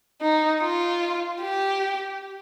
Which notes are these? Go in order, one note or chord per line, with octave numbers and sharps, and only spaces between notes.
D#4
F4
G4